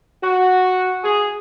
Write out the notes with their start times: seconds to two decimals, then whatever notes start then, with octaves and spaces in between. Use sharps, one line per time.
0.22 F#4
1.03 G#4